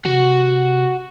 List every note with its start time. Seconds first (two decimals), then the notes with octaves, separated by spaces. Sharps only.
0.05 C3 F#4 F#5